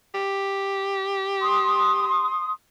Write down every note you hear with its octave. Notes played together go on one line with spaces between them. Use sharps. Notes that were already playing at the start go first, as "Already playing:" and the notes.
G4
C6 D#6